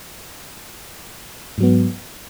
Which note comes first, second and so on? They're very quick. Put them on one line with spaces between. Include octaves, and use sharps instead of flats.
G#2 F#3 B3